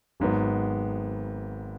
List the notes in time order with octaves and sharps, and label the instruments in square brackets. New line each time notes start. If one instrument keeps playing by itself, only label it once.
[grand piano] G#1 G#2 F#3 B3